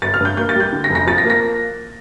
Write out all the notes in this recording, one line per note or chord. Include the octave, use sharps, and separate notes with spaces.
G1 A6
F6
G2 G6
A#3 G6
A6
G3
G6
D3
A#6
F1
A#6
F3 A6
A#6
A#3
A#6